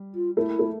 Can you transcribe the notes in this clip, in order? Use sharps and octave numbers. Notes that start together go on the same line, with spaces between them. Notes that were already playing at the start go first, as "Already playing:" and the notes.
Already playing: G3
F4
A3 E4
A#3
A3